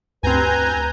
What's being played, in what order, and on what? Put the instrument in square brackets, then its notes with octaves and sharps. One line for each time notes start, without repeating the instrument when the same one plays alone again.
[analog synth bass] D2 [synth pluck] G2 C4 [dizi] B4 [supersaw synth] G#5 A#5 G6